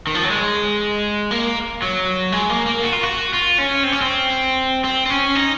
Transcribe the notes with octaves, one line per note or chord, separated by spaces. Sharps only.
D#3
F3
F#3
G#3
A#3
F#3
G#3
A#3
A#3
F#4
F4
F#4
F4
C#4
C4
C#4
C4
C4
C4
C#4
D#4